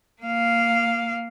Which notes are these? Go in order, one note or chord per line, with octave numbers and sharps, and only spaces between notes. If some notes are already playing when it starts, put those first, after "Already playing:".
A#3 F5